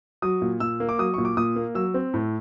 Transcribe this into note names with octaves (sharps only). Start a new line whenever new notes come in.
F#3 D#6
A#2
A#2 E6
A#3
D6
F#3 D#6
A#2 C#6
D6
A#2 D#6
A#3
F#3 E6
C4
A2